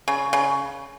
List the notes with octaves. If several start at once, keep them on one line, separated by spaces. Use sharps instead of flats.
C#3
C#3